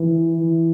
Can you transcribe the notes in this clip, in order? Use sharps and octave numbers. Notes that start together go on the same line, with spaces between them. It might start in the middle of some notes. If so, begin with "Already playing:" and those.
Already playing: E3
E3